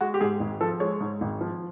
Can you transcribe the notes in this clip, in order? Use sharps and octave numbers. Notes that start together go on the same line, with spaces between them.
G#3 F#4
G4
G#2 G#4
G#1
F3 A4
G#3 C#5
G#2
G#1
F3